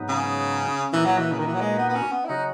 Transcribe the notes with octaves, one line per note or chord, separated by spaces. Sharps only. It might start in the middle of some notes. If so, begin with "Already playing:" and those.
Already playing: G#2 F#3 B3 D#4
C#3
A#2 E3 A#3 D#4 F#4 B4
F#3
E3
C#3
D#3
E3
F#3
G#3
B3
B3
C#4
B3
E4
C#3 F#3 C#4 D#4 F#4